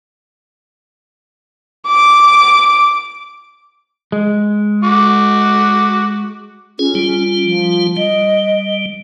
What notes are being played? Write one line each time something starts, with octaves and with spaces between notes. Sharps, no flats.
D6
G#3
F#4 D6
C#4 F4 G#4
G3 F4
F3
G3 D#5